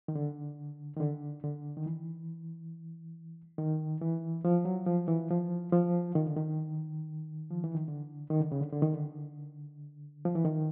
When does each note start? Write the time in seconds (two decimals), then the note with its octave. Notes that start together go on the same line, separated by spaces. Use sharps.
0.08 D#3
0.15 D3
0.96 D#3
1.00 D3
1.44 D3
1.77 D#3
1.86 E3
3.58 D#3
4.01 E3
4.45 F3
4.65 F#3
4.86 F3
5.08 E3
5.30 F3
5.73 F3
6.16 D#3
6.26 D3
6.37 D#3
7.51 F3
7.64 E3
7.75 D#3
7.88 D3
8.30 D#3
8.40 D3
8.52 C#3
8.61 D3
8.73 D3
8.82 D#3
8.93 D3
10.25 F3
10.35 E3
10.45 D#3